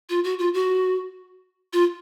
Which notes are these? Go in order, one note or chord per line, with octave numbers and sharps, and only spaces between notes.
F4
F#4
F4
F#4
F4